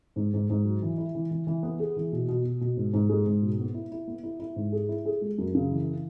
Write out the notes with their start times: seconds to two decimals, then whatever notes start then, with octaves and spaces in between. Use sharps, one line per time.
0.16 G#2
0.33 G#2
0.50 G#2
0.65 F#3
0.82 E3
0.98 E4
1.15 E3
1.31 E3
1.47 E3
1.63 B3
1.79 G#4
1.96 E3
2.12 B2
2.28 B2
2.45 B2
2.61 B2
2.77 G#2
2.93 G#2
3.09 G#3
3.26 G#2
3.42 B2
3.59 B3
3.75 E4
3.92 E4
4.08 B3
4.23 E4
4.40 E4
4.56 G#2
4.72 G#4
4.89 E4
5.05 G#4
5.21 G#3
5.38 F#2
5.55 C#3
5.71 E3